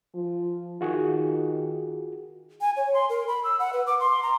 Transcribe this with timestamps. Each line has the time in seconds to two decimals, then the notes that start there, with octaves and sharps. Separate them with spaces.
0.14 F3
0.81 D#3 F4 F#4 G#4
2.61 G#5
2.77 C#5
2.94 C6
3.09 A#4
3.28 B5
3.44 E6
3.59 F#5
3.73 B4
3.87 D6
4.00 C6
4.23 A#5